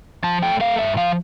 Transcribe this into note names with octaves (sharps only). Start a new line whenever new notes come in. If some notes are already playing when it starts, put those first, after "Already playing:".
F3 A5
A3 G5
A3 F5
G2 E5
F3 F5